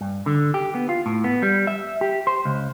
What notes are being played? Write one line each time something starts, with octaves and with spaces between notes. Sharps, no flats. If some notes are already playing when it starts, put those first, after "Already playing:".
G2
D3
G4
B3
F4
A2
B3
G3
E5
G4
C5
C#2